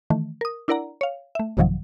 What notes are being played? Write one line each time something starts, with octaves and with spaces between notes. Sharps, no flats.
D#3 E3 A3
A#4 D#6
D4 E4 A#4 D5 F#5 A#5
C#5 F5
A3 E5
A1 F#2 C3 D#3 F3 F#3